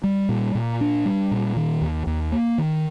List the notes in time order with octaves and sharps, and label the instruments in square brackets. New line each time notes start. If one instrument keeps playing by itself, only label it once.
[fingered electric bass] G3
A#2
A#2
D4
G3
A#2
D#3
D#2
D#2
A#3
D#3